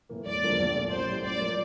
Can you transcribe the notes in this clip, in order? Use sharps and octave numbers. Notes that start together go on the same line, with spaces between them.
A2 E3 A#3
E1 D5
E2 D3 F3 A#3
A#1
A#2 A3
A1 C5
A2 G3
A1 D5
F3 A#3